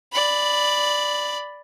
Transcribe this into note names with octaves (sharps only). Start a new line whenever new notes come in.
D5 B5